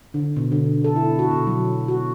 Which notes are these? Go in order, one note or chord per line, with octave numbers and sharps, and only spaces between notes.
D3
B2
D3
A4
E4
F#4
B2
F#3
F#4